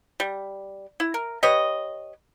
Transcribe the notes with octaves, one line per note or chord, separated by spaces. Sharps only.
G3
E4
A#4
G4 B4 C#5 D#5